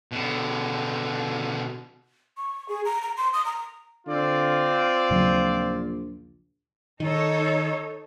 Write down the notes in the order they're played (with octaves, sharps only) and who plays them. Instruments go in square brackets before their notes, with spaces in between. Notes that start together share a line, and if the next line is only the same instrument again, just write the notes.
[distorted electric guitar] B2 D3
[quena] C#6
G#4
A#5
A#5
C6
D#6
A#5
[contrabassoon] D3 [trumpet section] C4 F4 D5
[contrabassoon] A#1 [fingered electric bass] D#2 C#3 F#3
[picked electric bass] D#3 [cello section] D#4 A4 C#5